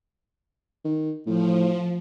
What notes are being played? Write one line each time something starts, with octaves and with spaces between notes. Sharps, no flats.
D#3
A2 F3